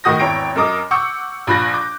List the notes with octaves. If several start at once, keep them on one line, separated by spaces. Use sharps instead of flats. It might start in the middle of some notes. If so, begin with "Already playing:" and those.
A2 D#3 F#4 D#6 G6 A#6
G#1 E2 E4 C#5 G5 D7
F#2 A#4 D#5 D6 D#6
F#5 C#6 D6 E6 G6 C#7
A#1 F3 B5 F#6 G6 A#6
D6 G6